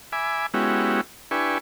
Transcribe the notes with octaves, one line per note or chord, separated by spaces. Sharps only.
E5 G#5 B5 D6
G#3 B3 C#4 E4 F#4 G4
D4 E4 G4 B4 G#5 C#6